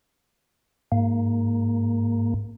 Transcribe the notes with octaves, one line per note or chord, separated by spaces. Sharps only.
G#2 A#3